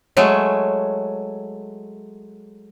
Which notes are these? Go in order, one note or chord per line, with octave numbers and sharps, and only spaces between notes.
F#3 G#3 A3